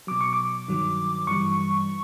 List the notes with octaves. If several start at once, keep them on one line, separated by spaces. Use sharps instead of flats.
B2 F#3 D6
C#6
D6
G2 D#3 F#3
G2 E3 G3 C#6